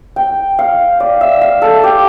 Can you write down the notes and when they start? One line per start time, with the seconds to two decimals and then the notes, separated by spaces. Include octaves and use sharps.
0.16 G5
0.59 F5
1.00 D5
1.21 E5
1.41 F5
1.62 A4
1.84 G4